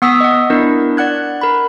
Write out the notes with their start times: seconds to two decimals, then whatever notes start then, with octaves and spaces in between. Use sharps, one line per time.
0.02 B3 F#5 D#6 E6 B6
0.20 D#5 F#5
0.50 B3 D4 E4 A#4
0.97 D5 F#5 F#6 G#6
1.41 A#4 B5